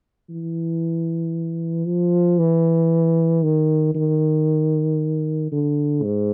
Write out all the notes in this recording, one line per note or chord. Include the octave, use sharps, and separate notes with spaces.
E3
F3
E3
D#3
D#3
D3
G#2